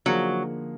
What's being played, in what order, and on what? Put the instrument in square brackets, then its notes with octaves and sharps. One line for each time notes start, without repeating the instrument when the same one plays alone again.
[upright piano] D3 F3 A#3 D#4 G#4 [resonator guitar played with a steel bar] F#3